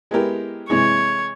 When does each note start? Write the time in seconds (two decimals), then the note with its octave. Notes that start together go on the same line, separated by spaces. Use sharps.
0.11 G#3 B3 E4 G4 A#4
0.69 C3 E3 G#3 C#5